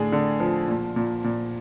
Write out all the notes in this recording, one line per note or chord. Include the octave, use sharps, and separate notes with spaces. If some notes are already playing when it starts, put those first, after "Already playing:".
Already playing: A2 D3 G#4
D3
F3
A#2
A#2
A#2